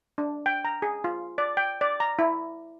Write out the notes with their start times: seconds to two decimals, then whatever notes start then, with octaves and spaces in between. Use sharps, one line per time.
0.18 D4
0.46 G5
0.65 A#5
0.82 G#4
1.04 F4
1.38 D5
1.57 G5
1.81 D5
2.00 A#5
2.19 E4